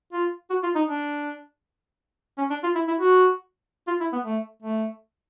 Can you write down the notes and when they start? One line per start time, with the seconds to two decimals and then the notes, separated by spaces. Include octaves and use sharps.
0.13 F4
0.50 F#4
0.63 F4
0.75 D#4
0.87 D4
2.38 C#4
2.50 D4
2.63 F4
2.75 E4
2.88 E4
3.00 F#4
3.87 F4
4.00 E4
4.13 B3
4.25 A3
4.62 A3